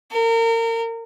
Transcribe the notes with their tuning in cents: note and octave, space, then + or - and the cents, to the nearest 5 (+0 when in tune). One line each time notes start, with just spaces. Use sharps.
A#4 -30